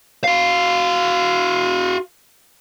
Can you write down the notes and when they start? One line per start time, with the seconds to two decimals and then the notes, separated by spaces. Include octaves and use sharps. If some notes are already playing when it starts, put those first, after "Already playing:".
0.24 F#4 F5